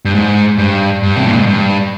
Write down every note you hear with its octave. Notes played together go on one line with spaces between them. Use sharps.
G2
G#2
G2
G2
C3
A#2
G#2
G2